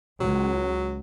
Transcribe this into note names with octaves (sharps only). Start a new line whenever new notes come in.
C#2 F#3